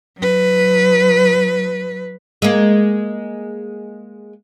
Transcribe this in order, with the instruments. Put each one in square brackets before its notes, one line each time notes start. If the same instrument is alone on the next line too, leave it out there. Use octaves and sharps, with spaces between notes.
[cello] F#3 B4
[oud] G#3 A#3